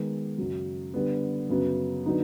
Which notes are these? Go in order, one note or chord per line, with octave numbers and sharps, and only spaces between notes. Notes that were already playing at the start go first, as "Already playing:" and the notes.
Already playing: D#3 G#3 B3
F#2 C#3 F#3
D3 G3 B3
F#2 C#3 F#3 B3
D3 F#3 B3 D#4